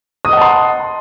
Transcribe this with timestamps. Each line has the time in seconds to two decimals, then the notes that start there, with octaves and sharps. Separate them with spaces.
0.25 D#6
0.29 D#5
0.33 F#5
0.37 A5
0.41 C6